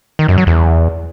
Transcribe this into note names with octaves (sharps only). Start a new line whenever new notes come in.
D#3
F#2
F#3
E2